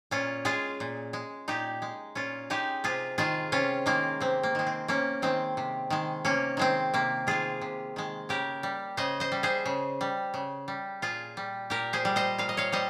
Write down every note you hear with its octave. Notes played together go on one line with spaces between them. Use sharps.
A#2 C#4 F4
G#3 F4 G#4
A#2
G#3
A#2 D#4 G4
G#3
A#2 C#4 F4
G#3 D#4 G4
C3 F4 G#4
D#3 G#3 F4 G#4
C3 C#4 F4
D#3 G#3 A#3
C3 C4
A#3
D#3 G#3
C4
C3 A#3 C#4
D#3 G#3 C4
C3
D#3 G#3
C3 A#3 C#4
D#3 G#3 C4
C3 A#3
D#3 G#3 F4 G#4
C3
D#3 G#3
C#3 G4 A#4
G3
C#3 C5 D#5
C5 D#5
G3
G#4 C5
C#3
G3
C#3
G3
A#2 F4 G#4
G3
A#2 G4 A#4
G#4 C5
G3
C5 D#5
A#2 F5
D#5
C#5 F5
G3 C5 D#5